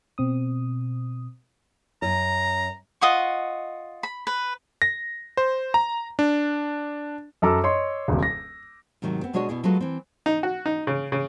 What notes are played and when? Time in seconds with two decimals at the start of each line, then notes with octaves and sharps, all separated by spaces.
0.18 B2 C4 D#6
2.02 F#2 A#5
3.01 F4 D#5 F#5 C#6
4.03 B5
4.27 B4
4.82 A#6
5.37 C5
5.74 A#5
6.19 D4
7.42 F#2 A4 A#5 D6 E6
7.64 C#5 D#5 C6
8.08 D#1 C#2 B2
8.23 A#6
9.02 G#2 C3 D#3 F#3 A3
9.21 B3 C4
9.33 B2 G#3 D4 F#4 C#5 D#5
9.49 B2 B3 E4 G#4
9.64 F#3 G#3 A3 F4 A4 B4
9.81 E3 C4
10.26 D#4
10.43 F#4
10.66 D#4
10.87 C#3
11.12 C#3